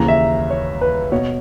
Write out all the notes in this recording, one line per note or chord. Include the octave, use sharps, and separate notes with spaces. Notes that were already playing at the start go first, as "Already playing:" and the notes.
Already playing: D#2 C#3 E3 A#5
E5
C#5
B4
B2 C#5